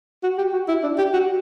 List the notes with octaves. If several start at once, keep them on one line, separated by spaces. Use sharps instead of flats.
F#4
G4
F#4
E4
D4
G4
F#4